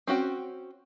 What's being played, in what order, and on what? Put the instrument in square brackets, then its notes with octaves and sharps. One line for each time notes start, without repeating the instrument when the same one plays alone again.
[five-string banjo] C4 C#4 F#4 G5